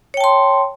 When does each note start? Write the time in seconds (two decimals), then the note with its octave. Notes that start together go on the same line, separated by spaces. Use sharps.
0.14 C#5
0.17 G5
0.21 A5
0.24 C6